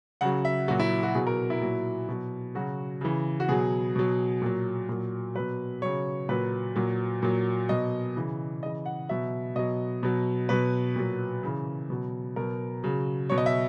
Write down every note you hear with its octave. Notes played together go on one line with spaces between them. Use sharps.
C#3 F#3 F#5
E5
A#2 F#3 F#4
E4
F#4
B2 F#3 G#4
A#4
E4
A#2 F#3
B2 F#3
C#3 F#3 F#4
C#3 E3
F#4
B2 F#3 G#4
B2 F#3
A#2 F#3
A#2 F#3
B2 F#3 B4
C#3 F#3 C#5
A#2 F#3 B4
A#2 F#3
A#2 F#3
B2 F#3 D#5
C#3 E3
C#3 E3 D#5
F#5
B2 F#3 E5
B2 F#3 D#5
B2 F#3
B2 F#3 B4
A#2 F#3
C#3 E3
B2 F#3
B2 F#3 A#4
C#3 F#3
B2 F#3 C#5
D#5
E5